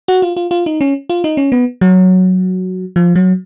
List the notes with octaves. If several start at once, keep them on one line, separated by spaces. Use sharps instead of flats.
F#4
F4
F4
F4
D#4
C#4
F4
D#4
C#4
B3
F#3
F3
F#3